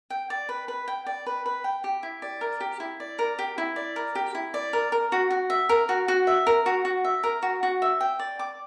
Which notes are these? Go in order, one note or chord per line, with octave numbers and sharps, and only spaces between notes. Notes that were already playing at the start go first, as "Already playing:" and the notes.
G5
D5
B4
B4
G5
D5
B4
B4
G5
G4
E4
D5
A#4
G4
E4
D5
A#4
G4
E4
D5
A#4
G4
E4
D5
A#4
A#4
F#4
F#4
E5
A#4
F#4
F#4
E5
A#4
F#4
F#4
E5
A#4
F#4
F#4
E5
G5
D5
D6